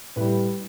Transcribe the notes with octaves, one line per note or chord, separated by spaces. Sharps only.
A2 G3 B4